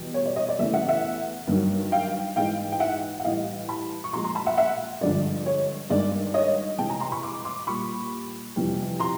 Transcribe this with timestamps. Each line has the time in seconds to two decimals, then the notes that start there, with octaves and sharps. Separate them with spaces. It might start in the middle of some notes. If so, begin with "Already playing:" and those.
Already playing: E2 B2 G3
0.14 C#5
0.26 D5
0.36 C#5 D#5
0.49 D5
0.59 E2 C#3 E3 A3 D5 E5
0.74 E5 F#5
0.88 E5 F#5
1.47 G2 D#3 F#3
1.92 F5 G5
2.36 G#2 E3 G#3 F5 G5
2.72 G5
2.80 E5 F#5
3.20 F#5
3.24 A2 E3 G3 D#5 F5
3.69 A5 B5
4.04 C#6
4.13 A#2 F3 G#3 A#5 C6
4.24 A#5 C6
4.35 A5 B5
4.46 E5 F#5
4.57 E5 F#5
5.01 G2 D3 F3 G#3 D5
5.46 C#5
5.90 G2 D#3 G#3 D5
6.34 C#5 D#5
6.78 C3 E3 G#3 G5 A5
6.89 G#5 A#5
7.00 A#5 C6
7.12 B5 C#6
7.23 C6 D6
7.45 C6 D6
7.67 A#2 G3 B5 C#6
8.56 F2 C3 E3 G3
9.00 A#5 C6